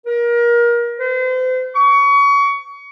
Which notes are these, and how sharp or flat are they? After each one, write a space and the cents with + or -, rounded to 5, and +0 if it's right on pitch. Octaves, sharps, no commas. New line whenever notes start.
A#4 +30
C5 -40
C#6 +25